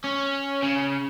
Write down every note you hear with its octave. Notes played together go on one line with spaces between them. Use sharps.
C#4
C#3